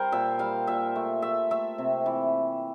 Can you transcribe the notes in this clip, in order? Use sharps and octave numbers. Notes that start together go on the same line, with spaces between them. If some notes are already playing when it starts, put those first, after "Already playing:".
Already playing: G3 A#4 C5
A#2 E5
G3 F5
A#2 E5
A3
A3 E5
A3 E5
C3
E3